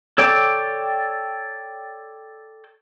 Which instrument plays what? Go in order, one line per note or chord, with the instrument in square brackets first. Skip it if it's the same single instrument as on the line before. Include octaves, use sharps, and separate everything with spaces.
[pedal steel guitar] A4 C#5 D5 G5 D6